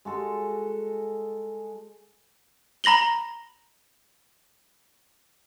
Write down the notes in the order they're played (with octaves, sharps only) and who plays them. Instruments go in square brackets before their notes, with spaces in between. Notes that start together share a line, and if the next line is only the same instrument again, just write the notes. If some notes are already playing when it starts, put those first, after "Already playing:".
[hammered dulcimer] G#3 F#4 A4
[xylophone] A#5 B5 A#6 F#7 G7